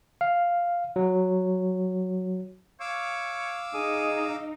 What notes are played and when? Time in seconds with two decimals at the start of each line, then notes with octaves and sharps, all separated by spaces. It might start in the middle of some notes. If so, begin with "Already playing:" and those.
0.21 F5
0.96 F#3
2.80 C#5 F5 D6 E6
3.74 D#4 G#4 D#6